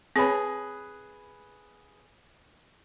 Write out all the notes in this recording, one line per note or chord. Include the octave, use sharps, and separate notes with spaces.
C4 G#4 B4 C#5 B5